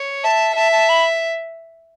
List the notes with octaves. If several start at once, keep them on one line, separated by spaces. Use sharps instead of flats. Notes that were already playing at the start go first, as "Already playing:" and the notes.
Already playing: C#5
E5 A5
E5 A5
A5
B5